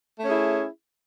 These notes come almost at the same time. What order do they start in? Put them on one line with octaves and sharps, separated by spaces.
A3 C#4 G#4 E4